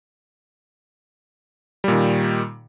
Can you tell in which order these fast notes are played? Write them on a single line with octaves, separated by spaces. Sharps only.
G3 A#2 D#3